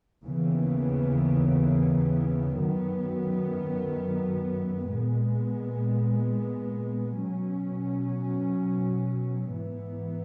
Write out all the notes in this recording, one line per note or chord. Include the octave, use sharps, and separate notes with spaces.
D#2 C#3 E3 B3
F#2 D#3 F#3 B3
A#2 G#3 B3
B2 F#3 C#4
G#2 E3 B3